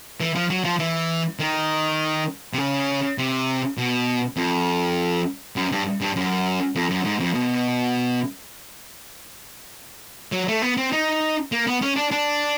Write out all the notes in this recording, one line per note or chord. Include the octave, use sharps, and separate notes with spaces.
E3
F3
F#3
F3
E3
D#3
C3
C#3
C3
B2
F2
F#2
G2
G2
F#2
F2
F#2
G#2
F2
B2
F#3
A3
B3
C4
D#4
A#3
B3
C#4
D4
D4